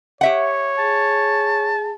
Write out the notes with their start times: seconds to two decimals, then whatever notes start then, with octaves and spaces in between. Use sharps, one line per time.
0.21 G4 C#5 E5 F#5
0.78 G#4 A5